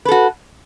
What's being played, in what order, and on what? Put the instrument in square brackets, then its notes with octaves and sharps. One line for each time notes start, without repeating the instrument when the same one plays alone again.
[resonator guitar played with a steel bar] B4
A4
F#4